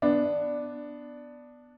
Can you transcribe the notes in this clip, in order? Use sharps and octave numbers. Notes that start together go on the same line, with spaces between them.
B3 D4